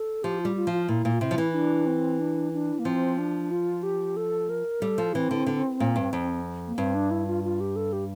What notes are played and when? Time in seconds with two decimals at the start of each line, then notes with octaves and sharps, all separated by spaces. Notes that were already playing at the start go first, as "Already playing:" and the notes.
Already playing: A4
0.23 F3 G4
0.40 G3 F4
0.56 F4
0.67 F3
0.73 F4
0.88 A#2 E4
1.05 A#2
1.14 F4
1.21 C3 E4
1.31 F3
1.38 E3
1.54 D4
1.86 C4
2.20 D4
2.53 D4
2.79 A#3
2.85 F3 C4
3.19 D4
3.51 F4
3.83 G4
4.17 A4
4.49 A#4
4.81 G3 A4
4.98 F3
5.14 E3 C4
5.31 D3
5.46 D3
5.80 A#2
5.96 G2
6.13 F2
6.68 A#3
6.78 G2 C4
6.95 D4
7.11 E4
7.27 F4
7.44 F4
7.60 G4
7.76 A4
7.93 G4